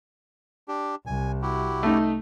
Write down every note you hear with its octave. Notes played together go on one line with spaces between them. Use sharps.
D4 G4
C2 G#5
E4 F#4 G4
A3 D#4